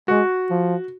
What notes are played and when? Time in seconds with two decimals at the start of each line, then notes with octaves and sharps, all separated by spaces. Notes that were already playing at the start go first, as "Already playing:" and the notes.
0.08 G#3 F#4
0.50 F3